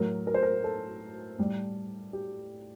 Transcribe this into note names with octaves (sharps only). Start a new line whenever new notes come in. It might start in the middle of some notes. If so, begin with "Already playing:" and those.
Already playing: A2 F#3 A#4
A#4
C5
A#4
A4
A2 G3
G4